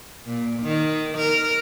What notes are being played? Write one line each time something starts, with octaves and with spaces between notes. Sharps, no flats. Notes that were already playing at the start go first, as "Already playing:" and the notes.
A#2
D#3
A#4